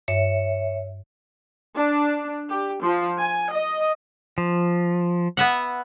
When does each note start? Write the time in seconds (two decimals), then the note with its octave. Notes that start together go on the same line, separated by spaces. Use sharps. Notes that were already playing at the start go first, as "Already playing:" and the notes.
0.08 G2 C#5 E5
1.76 D4
2.49 G4
2.81 F3
3.19 G#5
3.52 D#5
4.38 F3
5.37 B3 E5 F#5